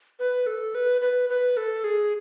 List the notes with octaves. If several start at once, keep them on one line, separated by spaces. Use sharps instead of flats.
B4
A4
B4
B4
B4
A4
G#4